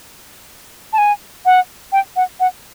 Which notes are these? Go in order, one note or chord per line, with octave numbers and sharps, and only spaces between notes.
A5
G#5
F#5
G5
F#5
F#5